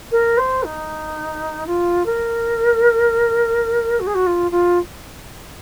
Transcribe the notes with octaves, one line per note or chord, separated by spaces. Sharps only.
A#4
C5
D#4
F4
A#4
F#4
G#4
F#4
F4
F4